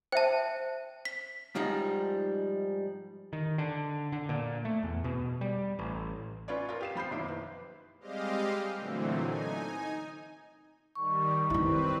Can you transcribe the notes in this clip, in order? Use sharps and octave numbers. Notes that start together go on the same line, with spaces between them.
C5 E5 G5 A5
B6
G#2 F3 G3 D#4
D#3
D3
D3
A#2
A3
E2
B2
G3
A1
C#4 F4 B4 C#5 D5
F4 A#4
G4 F5 E7
F3 B5 G6 C7
F#1 D#3 E4 C5 D6
B4
G3 G#3 C4 G4 D#5 F5
A#2 D3 E3 F#3 A3 C4
D#4 G#5
D#3 G3 C#6
D#3 C4 E4 B4